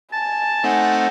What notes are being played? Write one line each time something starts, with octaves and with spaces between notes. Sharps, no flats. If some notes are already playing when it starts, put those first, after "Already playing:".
G#5 A5
A3 C4 D#4 F#5